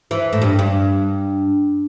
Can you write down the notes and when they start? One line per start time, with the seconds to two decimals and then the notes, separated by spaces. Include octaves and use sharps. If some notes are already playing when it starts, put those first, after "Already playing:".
0.11 E3
0.33 A2
0.42 G2
0.59 G2